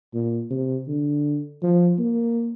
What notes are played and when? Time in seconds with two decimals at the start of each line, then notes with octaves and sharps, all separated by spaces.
0.14 A#2
0.51 C3
0.88 D3
1.62 F3
1.99 A#3